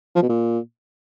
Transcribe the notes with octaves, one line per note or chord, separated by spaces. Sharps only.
F3
B2
A#2